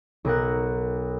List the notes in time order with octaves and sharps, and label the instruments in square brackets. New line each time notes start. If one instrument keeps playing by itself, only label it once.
[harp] B1 A#4 F#5